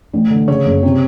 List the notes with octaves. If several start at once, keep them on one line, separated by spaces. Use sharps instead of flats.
A1
D3
C#3 C#5
F#1
C3